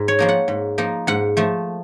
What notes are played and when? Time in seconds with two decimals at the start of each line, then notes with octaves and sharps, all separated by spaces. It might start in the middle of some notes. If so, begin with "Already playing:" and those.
Already playing: G#2
0.08 C#5
0.19 F3 A#3 D#4
0.29 F#5
0.48 G#2
0.78 F3 A#3 D#4
1.07 G#2 F#5
1.37 F3 A3